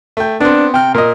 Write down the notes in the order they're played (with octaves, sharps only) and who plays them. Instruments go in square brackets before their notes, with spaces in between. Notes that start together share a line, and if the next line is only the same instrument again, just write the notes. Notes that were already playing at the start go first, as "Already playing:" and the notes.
[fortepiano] A3 G5
[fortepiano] B3 C4 [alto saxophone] D4
[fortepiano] C3 F6 [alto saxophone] G5
[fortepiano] A#2 D#5 [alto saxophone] A#4